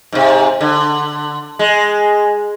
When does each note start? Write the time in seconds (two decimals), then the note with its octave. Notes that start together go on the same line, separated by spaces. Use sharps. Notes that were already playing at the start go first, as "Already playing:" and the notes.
0.12 G#2 C3
0.61 D3
1.59 G#3